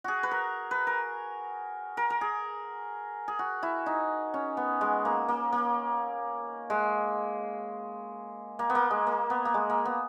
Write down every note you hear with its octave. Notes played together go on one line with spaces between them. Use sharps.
F#4 G#4
B4
A#4
B4
A#4
A#4
A#4
G#4
G#4
F#4
E4
D#4
C#4
B3
G#3
A#3
A#3
A#3
G#3
A#3
B3
A#3
G#3
A#3
B3
A#3
G#3
A#3
B3